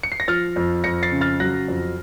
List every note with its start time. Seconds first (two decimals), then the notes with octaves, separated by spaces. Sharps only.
0.03 C#7
0.12 C7
0.20 A#6
0.28 F3 F6 A6
0.56 F2
0.84 F2 A#6 C#7
1.03 A6 C7
1.12 C#3
1.21 F6 A6
1.40 F#3 F#6 A#6
1.68 F2